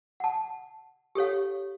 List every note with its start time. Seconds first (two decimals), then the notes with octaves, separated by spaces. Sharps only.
0.20 F#5 A5
1.15 G4 A4 C#5 F5